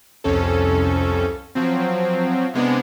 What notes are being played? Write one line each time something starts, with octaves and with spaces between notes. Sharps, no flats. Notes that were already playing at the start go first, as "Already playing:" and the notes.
C2 F2 C#4 A4
F3 F#3 C4
C3 G#3 B3 D4